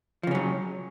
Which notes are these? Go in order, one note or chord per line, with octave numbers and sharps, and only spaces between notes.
C#3 F3 F#3 C#4